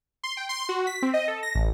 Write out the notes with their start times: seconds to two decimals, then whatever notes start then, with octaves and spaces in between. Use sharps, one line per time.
0.24 C6
0.37 G5
0.49 C6
0.69 F#4
0.87 B6
1.02 C4
1.14 D#5
1.28 A4
1.43 A#6
1.55 A1